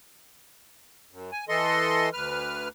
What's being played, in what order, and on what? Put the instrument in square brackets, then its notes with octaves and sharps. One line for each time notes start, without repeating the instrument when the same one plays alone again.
[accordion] F#2
G#5
E3 A4 D#5 C6
D2 B4 F6